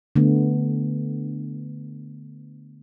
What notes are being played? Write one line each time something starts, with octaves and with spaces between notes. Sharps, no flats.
D3 A3 B3